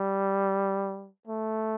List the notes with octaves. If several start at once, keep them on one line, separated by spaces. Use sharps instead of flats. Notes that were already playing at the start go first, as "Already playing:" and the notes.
Already playing: G3
A3